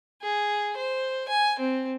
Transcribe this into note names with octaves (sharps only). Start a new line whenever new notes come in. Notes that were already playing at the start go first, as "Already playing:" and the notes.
G#4
C5
G#5
C4